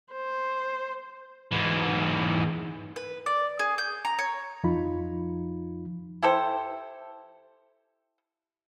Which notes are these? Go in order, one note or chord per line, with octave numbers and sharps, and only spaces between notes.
C5
G#2 E3
B4
D5
G#4
G6
A#5
C#5
F2 F3 D#4 F4 B5
E4 G4 A4 C5